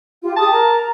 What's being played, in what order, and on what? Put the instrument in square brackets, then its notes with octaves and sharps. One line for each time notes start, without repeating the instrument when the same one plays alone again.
[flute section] F4 G4
[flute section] G4 D#6 [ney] G#4 [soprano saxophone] A5
[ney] A#4 [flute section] A#5